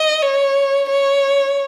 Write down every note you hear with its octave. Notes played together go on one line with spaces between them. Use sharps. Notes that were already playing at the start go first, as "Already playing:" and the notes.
Already playing: D#5
C#5
C#5